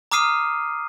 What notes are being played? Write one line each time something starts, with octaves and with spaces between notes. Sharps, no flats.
A#5 D6 D#6 F6 C7 D#7